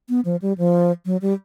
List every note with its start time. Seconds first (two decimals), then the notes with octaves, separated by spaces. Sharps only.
0.09 B3
0.25 F3
0.42 G3
0.58 F3
1.06 F#3
1.22 G3